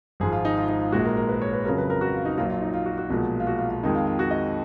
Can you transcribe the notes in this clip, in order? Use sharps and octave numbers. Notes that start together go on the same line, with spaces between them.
G#1 G#2 F3 G#4
F4
D#4
F4
D#4
F4
A#1 A#2 G#3 F#4
A#4
A#4
B4
C#5
B4
F2 C#3 F#3 A#4
B4
A#4
F#4
F4
D#4
A#1 A#2 F#3 F4
F4
D#4
F4
F#4
F#4
B1 A#2 F3 G#3
F4
F#4
F4
F4
F2 D#3 G#3 D#4
F4
F4
F#4
D#5